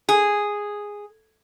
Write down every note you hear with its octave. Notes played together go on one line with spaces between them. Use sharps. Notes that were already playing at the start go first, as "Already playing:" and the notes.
G#4